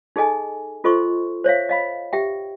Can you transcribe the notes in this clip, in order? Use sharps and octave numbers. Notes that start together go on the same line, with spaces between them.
D#4 G#4 A4 D#5 G#5
F4 A4 C5 D#5 C6 C#6
C5 C#5 E5 F5
D#5 F5 B5
G4 E5 G5